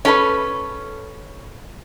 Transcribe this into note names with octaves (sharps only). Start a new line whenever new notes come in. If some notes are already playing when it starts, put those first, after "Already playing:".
C#4 A4 B4